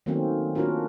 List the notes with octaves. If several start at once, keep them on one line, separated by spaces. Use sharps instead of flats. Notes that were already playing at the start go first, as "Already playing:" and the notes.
D#3 F#3 A3 A#3 C4 C#4
A#3 C#4 D4 F4 F#4 A#4